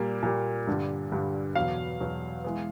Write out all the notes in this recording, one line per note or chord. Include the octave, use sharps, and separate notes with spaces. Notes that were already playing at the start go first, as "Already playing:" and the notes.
Already playing: A#2 G3 A#3
A#2 G3 A#3
G2 D3 G3
G2 D3 G3
E2 B2 F#3 F5
E2 B2 F#3
E3 G#3 B3